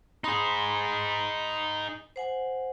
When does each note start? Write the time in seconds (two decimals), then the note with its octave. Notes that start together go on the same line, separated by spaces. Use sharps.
0.24 D#4 G#4 B5 C6 D#6
2.16 C5 F#5 G#5